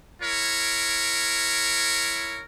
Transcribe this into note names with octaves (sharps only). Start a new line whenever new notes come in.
E4 A#4 C#5